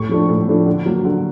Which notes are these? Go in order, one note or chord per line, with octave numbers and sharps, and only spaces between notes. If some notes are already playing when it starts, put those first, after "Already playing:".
Already playing: A2 C#6
F3 A3 D4
A2
F3 A3 D4
D3
F#3 A#3
D3